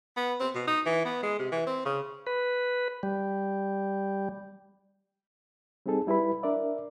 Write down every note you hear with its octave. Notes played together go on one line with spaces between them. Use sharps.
B3
C4
B2
D#4
E3
B3
G#3
C3
E3
C4
C#3
B4
G3
G3 C4 D#4 G#4 A4
G3 E4 B4 B5
D4 A#4 D5 E5